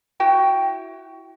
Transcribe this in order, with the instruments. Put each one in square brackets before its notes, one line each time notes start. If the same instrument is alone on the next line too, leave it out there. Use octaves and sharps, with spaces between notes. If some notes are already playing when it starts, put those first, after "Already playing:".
[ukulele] E4 F#4 G5